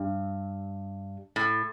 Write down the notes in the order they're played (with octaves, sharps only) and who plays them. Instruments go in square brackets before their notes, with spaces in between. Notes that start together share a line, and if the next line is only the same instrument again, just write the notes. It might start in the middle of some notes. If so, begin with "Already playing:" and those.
Already playing: [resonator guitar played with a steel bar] G2
A2